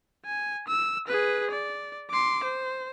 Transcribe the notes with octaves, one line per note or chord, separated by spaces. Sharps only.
G#5
E6
G#4 B4
D5
C6 D6
C5